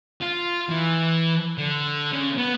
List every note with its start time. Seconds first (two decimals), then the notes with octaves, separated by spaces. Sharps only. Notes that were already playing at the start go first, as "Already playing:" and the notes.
0.21 F4
0.69 E3
1.58 D3
2.13 C#3
2.38 B3